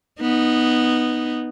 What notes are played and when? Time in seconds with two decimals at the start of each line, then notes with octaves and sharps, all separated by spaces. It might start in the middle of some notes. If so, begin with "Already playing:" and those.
0.21 B3 D#4